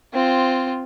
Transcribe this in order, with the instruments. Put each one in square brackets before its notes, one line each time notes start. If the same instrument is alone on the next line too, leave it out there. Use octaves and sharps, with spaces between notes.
[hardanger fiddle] C4 F4